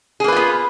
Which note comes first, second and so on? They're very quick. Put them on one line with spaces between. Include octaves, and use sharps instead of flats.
G#4 A#3 B4 F4 B3